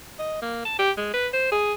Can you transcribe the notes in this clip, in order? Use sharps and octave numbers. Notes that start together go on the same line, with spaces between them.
D#5
A#3
A5
G4
G#3
B4
C5
G#4